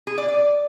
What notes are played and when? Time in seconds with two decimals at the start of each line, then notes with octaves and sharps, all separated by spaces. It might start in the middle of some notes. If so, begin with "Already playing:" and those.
0.07 G#4
0.18 D5
0.28 D5